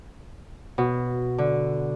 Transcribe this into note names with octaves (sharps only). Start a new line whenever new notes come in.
B2
D3